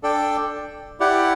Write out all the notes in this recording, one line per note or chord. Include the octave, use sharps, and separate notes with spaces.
D4 A4 D5 G5
E4 G4 D5 F#5